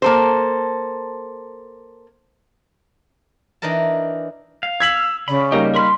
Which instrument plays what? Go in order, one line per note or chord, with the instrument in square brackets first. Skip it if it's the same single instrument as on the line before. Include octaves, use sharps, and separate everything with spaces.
[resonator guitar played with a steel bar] A#3 A4 C5
[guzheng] E3 D4 D#4 A#4 A5
[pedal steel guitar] F5
[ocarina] E6 [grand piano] G#6 B6 F#7
[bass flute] C#3 [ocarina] D5 [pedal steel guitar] B5
[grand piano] G3 A#3 D#4 [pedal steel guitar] G4 A#4
[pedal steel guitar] A#4 B5 F6 [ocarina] C6